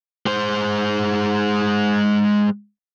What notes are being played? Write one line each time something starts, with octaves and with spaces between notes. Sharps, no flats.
G#3 C5